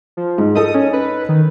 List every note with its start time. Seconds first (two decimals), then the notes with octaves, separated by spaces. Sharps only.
0.17 F3
0.38 G#2
0.55 D#4 A4 D#6
0.75 C#4
0.93 B4
1.29 D#3